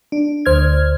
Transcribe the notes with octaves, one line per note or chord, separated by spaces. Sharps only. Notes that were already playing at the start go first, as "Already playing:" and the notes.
D4
D2 C5 F6 G#6